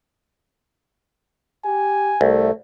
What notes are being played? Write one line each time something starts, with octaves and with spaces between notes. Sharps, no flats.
G4 G#5
C2 A3